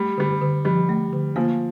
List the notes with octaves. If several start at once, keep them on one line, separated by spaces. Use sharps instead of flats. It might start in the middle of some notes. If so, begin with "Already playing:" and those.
Already playing: G3 A3
D3 G3
D3
F3 G3
A3
D3
F3 A#3